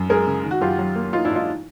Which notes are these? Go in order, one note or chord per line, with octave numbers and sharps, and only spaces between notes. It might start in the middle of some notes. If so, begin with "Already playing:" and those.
Already playing: F#2
G#3 G#4 A#4
C#3
D#3
F#4
F#2 F4 G4
F#3
A#3
E3 D#4 F4
D4 E4
G#2
D#4 F4